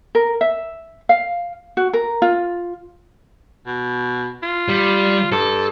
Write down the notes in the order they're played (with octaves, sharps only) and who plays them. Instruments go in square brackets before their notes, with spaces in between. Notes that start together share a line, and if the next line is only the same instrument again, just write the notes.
[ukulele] A#4
E5
F5
F#4
A#4
F4
[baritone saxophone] B2
F4
[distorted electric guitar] G3
[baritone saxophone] G2 [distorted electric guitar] A4